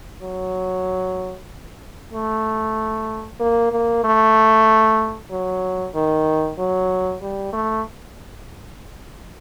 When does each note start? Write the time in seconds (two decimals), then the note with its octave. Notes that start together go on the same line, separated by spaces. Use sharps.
0.22 F#3
2.13 A3
3.40 A#3
3.72 A#3
4.04 A3
5.31 F#3
5.94 D#3
6.58 F#3
7.22 G3
7.53 A3